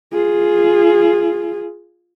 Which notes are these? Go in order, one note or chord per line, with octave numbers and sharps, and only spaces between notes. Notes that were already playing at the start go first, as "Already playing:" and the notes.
F4 G#4